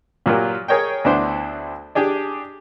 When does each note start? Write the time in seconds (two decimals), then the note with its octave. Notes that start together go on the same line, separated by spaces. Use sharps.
0.26 A#2 F#3 F4 G4 A#4
0.68 G#4 A#4 C#5 D#5 G5
1.04 D2 B3 D4 E4 C5
1.95 D4 G4 G#4 D5